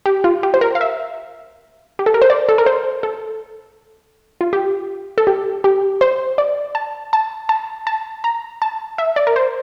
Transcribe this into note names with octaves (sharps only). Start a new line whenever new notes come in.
G4
F4
G4
C5
A#4
F5
E5
G4
A4
A#4
C5
D5
A4
A#4
C5
A4
F4
G4
A4
G4
G4
C5
D5
A5
A5
A5
A5
A#5
A5
E5
D5
A#4
C5